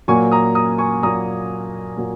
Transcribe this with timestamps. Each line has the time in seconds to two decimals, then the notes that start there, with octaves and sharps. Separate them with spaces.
0.08 A#2 F#3 A#3 G#5 C#6
0.31 A#5 D#6
0.55 A#5 D#6
0.78 G#5 C#6
1.02 A#2 F#3 A#3 A#5 D#6
1.97 A#2 F#3 A#3